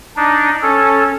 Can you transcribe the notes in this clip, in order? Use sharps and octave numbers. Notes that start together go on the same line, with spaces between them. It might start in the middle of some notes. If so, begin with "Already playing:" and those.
D4 D#4
C#4 A4